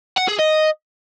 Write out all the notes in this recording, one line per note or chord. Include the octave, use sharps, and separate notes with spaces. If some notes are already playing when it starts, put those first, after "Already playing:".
F#5
G#4
D#5